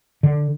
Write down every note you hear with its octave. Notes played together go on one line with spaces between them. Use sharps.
D3